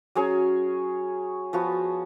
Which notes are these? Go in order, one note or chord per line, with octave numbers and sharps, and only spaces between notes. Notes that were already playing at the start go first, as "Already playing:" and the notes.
F#3 C#4 G#4 C#5
F3 B3 F#4